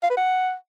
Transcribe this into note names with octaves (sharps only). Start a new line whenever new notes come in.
F5
B4
F#5